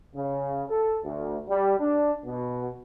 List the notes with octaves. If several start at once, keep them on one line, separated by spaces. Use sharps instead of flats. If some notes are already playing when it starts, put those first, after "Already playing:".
C#3
A4
D2
G3
D4
B2